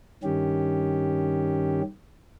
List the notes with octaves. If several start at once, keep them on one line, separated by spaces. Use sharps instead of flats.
G2 D#3 C#4 G4